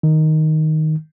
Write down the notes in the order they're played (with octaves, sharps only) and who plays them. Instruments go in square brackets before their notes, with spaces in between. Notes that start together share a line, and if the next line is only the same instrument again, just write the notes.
[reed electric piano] D#3